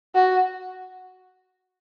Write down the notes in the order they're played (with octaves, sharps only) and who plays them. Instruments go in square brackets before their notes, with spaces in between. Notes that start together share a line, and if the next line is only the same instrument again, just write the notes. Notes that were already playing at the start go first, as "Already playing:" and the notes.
[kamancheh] F#4